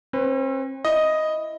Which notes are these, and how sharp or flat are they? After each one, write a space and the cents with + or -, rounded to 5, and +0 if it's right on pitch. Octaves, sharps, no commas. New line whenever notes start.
C4 +45 B4 +20
E4 +0 D#5 +0